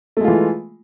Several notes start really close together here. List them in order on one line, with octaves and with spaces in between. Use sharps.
A3 G#3 F4 E3